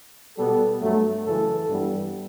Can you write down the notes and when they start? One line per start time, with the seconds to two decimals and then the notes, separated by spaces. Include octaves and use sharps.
0.36 B2 G3 B3 A4
0.81 G2 F#3 A3
1.25 F#2 C#3 E3 A4
1.69 G2 E3 G3 B3